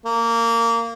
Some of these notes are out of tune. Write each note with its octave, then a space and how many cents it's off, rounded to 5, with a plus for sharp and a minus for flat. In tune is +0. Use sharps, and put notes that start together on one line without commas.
A#3 -20